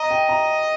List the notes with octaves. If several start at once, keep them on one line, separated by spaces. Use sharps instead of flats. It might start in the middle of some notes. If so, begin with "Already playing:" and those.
Already playing: D#5 A#5
G5
A#5